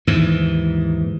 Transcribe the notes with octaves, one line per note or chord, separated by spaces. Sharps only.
D#2 G#2 E3